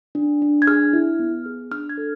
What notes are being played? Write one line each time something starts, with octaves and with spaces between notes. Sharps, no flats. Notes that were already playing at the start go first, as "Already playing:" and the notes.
D4
D4
G#6
G#4 F6
E4
B3
G#4
D4 F6
G#6
A4